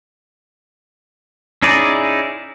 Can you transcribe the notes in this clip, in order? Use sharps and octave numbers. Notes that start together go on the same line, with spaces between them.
C#4 D#4 E4 G#4 D5